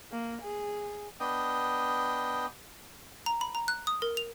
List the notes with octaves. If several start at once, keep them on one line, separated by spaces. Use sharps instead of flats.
A#3
G#4
B3 D4 D#5 G5 D#6
A#5
B5
A#5
F#6
D#6
A#4
F7